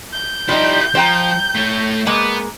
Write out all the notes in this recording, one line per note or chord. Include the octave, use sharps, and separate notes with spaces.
G6
F3 G3 D#4 E4 G4
F3 C5 G5 A#5
A3 C#5
G#3 A#3 B3